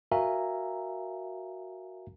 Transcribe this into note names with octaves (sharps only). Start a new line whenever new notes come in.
F#4 A#4 E5 F5 G#5 A#5